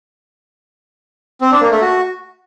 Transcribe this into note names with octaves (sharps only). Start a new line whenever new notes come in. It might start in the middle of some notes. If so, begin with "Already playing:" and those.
C4
D4
A#3
A3
F#4